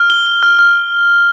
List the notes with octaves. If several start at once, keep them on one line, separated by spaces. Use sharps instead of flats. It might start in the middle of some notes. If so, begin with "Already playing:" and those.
Already playing: F6
G7
G7
F6
F6